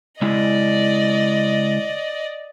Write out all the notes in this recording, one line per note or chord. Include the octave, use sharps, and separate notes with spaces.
C#3 G#3 E4 D5 D#5